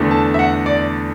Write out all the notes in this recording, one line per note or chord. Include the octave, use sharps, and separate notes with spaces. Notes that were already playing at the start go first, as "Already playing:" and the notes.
Already playing: E2 D3 A3 D4
A5
E5
F#5
D5